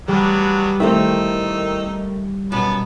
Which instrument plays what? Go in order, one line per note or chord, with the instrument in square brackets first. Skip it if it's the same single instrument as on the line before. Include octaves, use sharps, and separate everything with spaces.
[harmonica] F#3 B3 D4 [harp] G3
[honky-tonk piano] D#3 A3 [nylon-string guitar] C4 E4 E5 [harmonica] D#4 E6
[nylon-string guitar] F#2 B2 [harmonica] B3 B4 A5